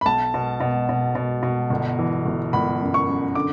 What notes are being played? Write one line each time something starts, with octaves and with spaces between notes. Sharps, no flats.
B5
B1 A5
B2
B2
B2
B2
B2
G1
E3
G1
G1 B5
F#2
C#6
F#2
D3 D6